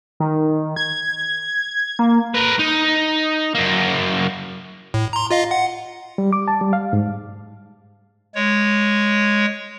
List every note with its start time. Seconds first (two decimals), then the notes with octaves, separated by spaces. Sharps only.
0.20 D#3
0.76 G#6
1.99 A#3
2.35 A#4 B4
2.59 D#4
3.55 F#2 A#3
4.94 A2
5.13 A#5 C6
5.31 F4 D#5 F5
5.51 F#5
6.18 G3
6.33 D6
6.48 A5
6.61 G3
6.73 F5
6.93 G#2
8.35 G#3 C#5